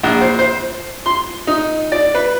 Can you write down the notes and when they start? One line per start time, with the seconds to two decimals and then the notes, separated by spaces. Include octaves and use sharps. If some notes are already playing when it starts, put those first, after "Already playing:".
0.03 A#1
0.21 C5
0.39 C5
1.06 C6
1.47 D#4
1.92 D5
2.15 B4